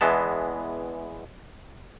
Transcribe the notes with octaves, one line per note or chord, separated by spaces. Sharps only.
E2 E3 G#3 B3 A5